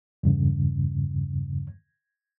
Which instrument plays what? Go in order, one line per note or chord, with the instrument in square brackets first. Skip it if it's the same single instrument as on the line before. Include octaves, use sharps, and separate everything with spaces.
[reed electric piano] E2 G2 C#3